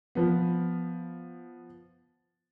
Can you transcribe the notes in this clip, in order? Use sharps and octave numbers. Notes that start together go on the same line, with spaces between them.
F3 B3